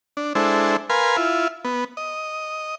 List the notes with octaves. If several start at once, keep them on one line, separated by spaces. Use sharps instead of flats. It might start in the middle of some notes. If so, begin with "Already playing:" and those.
D4
G#3 D4 E4 A4 C5
A#4 B4 F5 G#5 C6
E4 F4
B3
D#5